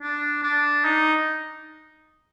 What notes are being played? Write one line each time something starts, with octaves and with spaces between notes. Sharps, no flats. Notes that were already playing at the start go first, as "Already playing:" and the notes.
D4
D4
D#4